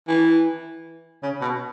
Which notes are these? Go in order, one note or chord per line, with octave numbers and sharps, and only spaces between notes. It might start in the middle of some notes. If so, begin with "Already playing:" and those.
E3
C#3
B2